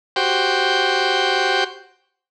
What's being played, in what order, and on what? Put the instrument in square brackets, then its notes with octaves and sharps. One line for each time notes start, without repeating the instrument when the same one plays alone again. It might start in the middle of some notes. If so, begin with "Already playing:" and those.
[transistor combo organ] F#4 G4 C5 G5